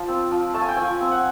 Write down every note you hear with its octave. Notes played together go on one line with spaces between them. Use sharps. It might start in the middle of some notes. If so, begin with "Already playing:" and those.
Already playing: F3 A5
C4
F3
A3 A5
G#5
G5
F3 G#5
C4
F#5